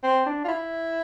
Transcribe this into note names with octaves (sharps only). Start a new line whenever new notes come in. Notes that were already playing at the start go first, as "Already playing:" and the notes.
C4
D4
F4
E4